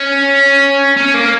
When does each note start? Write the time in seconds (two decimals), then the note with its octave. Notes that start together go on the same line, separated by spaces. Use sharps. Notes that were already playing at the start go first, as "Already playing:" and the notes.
Already playing: C#4
0.97 C#4
1.14 A#3